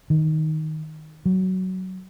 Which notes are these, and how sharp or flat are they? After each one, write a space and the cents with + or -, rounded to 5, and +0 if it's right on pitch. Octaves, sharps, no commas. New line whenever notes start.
D#3 +5
F#3 +15